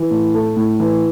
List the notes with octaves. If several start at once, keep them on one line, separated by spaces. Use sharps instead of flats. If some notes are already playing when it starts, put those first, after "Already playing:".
Already playing: E3
A2
A3
A2
E3